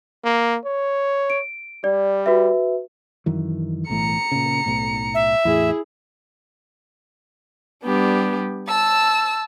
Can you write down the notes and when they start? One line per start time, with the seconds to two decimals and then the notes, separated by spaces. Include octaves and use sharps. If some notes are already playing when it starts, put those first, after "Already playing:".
0.24 A#3
0.65 C#5
1.30 D7
1.84 G3 D5
2.26 F#4 B4 E5
3.26 F#2 D#3 E3
3.89 B1 A2 E3 A#5 C#7
4.32 A#2 C#3
4.66 B1 A2
5.15 E5
5.45 E2 A2 E4 G#4
7.83 G3 B3 D4 G4
8.68 A5 E6